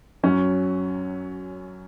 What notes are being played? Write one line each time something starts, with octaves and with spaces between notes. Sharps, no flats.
F#2 F#3 C#4